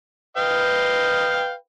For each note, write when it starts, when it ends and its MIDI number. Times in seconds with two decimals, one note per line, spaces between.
0.37 1.57 71
0.37 1.53 75
0.37 1.53 77
0.37 1.53 79